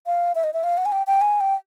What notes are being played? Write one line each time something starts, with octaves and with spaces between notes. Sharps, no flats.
F5
E5
D#5
E5
F5
F#5
G#5
G5
G5
G#5
G5